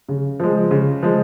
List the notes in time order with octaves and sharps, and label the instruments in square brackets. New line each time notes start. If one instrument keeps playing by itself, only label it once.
[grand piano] C#3
F3 G#3
C#3
F3 G#3